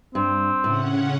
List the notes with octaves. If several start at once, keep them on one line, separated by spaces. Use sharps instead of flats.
G2 C4
A2 C#3 C#4 F#5